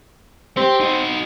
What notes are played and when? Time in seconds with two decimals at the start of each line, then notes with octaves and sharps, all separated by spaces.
0.57 C4 G4
0.80 D#4 F#4